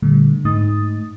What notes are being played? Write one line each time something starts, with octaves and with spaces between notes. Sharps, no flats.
A#2 D3 G3 A3
G#2 A3 D#4 D#6 A6